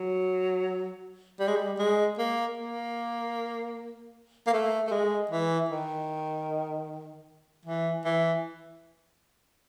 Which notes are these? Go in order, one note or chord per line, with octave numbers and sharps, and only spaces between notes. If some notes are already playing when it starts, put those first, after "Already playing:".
Already playing: F#3
G3
G#3
G3
G#3
A#3
A#3
A#3
A3
A3
G#3
E3
D#3
E3
E3